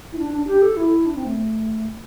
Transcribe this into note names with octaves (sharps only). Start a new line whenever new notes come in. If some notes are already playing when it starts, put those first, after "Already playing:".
E4
D4
D4
G4
A4
E4
D4
C4
A3